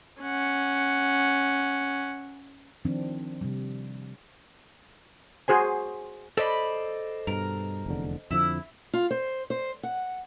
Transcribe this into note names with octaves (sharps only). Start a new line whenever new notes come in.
C#4 F#5
D#3 F3 C4 D4
C3 G3
F#4 G#4 C5 G#5
A4 C5 D5 D#5 B5
G2 B2 A#4
F1 E2 D3
F2 D3 F3 E4
F4
C5
C5
F#5